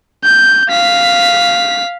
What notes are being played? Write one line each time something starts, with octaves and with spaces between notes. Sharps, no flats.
G6
F5 B6